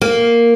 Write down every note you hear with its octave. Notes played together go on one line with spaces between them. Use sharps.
A#3